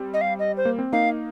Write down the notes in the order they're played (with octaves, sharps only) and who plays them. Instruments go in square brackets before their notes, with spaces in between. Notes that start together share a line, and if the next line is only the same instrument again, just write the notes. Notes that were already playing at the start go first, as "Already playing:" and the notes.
Already playing: [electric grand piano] G3 C4
[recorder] D#5
F5
D#5
C5
[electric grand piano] A#3
C4
[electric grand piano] A#3 D#4 [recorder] F5